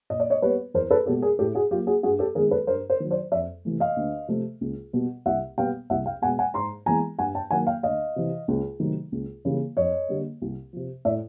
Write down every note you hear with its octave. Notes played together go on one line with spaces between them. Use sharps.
A#2 D#5
D5
C#5 D#5
G3 B3 B4 C#5
E2 A#4 C5
A4 B4
B2 G#3 B3 G4 A4
G#4 A#4
A2 G4 A4
F#4 G#4
F#3 A#3 F4 G4
F#4 G#4
G2 F#4 G#4
G4 A4
D#3 G#3 B3 G#4 A#4
A4 B4
G2 A#4 C5
A#4 C5
D#3 F#3
C5 D5
F2 D5 E5
C3 E3 A3
D#5 F5
D2
C3 F3 A3
C#2
B2 G3 B3
C2 E5 F#5
B2 G3 B3 F5 G5
C2 E5 F#5
F5 G5
B2 G#3 B3 F#5 G#5
F#5 G#5
G#2 A#5 C6
E3 G#3 B3 G#5 A#5
G2 F#5 G#5
G5 A5
D#3 F#3 A#3 F#5 G#5
F5 G5
D2 D#5 F5
C3 E3
C#2
C3 D#3 F#3 A3
C#2
C#3 E3 G3 A#3
F2 C#5 D#5
D3 G3 A#3
C2
C3 F3
A2 D5 E5